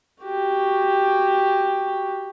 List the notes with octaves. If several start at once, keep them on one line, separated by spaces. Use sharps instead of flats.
F#4 G4